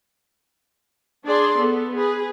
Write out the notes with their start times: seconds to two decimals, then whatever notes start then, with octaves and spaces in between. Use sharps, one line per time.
1.24 D4 G#4 D5 C6
1.58 B3 A4
1.96 G#4 B4